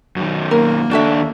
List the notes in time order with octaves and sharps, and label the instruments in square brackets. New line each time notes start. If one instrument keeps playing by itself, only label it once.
[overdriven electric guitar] F#2 D#3
[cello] A#3 [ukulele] A#4
[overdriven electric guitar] D#2 D4 [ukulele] F#4 A4 E5